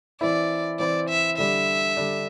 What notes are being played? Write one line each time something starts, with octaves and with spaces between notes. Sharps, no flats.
E3 C4 E4 D5
E3 C4 E4 D5
E5
D3 G3 D4 E5
D3 G3 D4